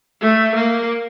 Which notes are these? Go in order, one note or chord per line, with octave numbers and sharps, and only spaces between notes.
A3
A#3